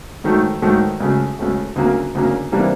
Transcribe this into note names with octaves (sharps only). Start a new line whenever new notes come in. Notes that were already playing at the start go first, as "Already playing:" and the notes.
G#2 D#3 F#3 A3
G#2 D#3 F#3 A3
C#2 C#3 F#3 A3
C#2 C#3 F#3 A3
D2 C#3 F#3 A#3
D2 C#3 F#3 A#3
C3 E3 G3 A#3 D4